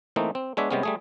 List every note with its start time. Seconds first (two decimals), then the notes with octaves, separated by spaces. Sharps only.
0.16 E3 A3 A#3 C4 D#4
0.35 C4
0.57 G#3 B3 D4 C#5 E5
0.71 C3 G3 G#3 B3 C#4
0.83 G3 A3 G#4